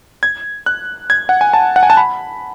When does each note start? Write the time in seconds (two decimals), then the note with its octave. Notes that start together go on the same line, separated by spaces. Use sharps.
0.23 G#6
0.66 F#6
1.10 G#6
1.29 F#5
1.41 G#5
1.53 A5
1.76 F#5
1.83 G#5
1.90 A5
1.97 B5